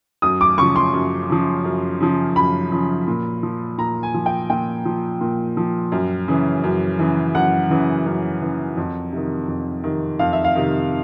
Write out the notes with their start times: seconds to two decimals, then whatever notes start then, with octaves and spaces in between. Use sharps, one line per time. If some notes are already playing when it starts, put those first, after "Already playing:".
0.22 F#2 D#6
0.41 D6
0.58 C#3 F3 C#6
0.76 C6
0.94 F#2
1.30 C#3 F3
1.65 F#2
2.00 C#3 F3
2.36 F#2 B5
2.72 C#3 F3
3.08 A#2
3.43 F3
3.78 A#2 A#5
4.03 G#5
4.14 F3
4.26 G5
4.50 A#2 G5
4.85 F3
5.21 A#2
5.57 F3
5.92 F#2
6.28 C#3 E3
6.64 F#2
6.99 C#3 E3
7.35 F#2 F#5
7.70 C#3 E3
8.06 F#2
8.42 C#3 E3
8.77 F2
9.13 C3 D#3
9.48 F2
9.84 C3 D#3
10.19 F2 F5
10.33 E5
10.45 F5
10.55 C3 D#3